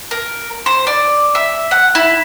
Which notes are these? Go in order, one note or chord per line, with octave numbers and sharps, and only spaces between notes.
A#4
C5
D5
E5
F#5
E4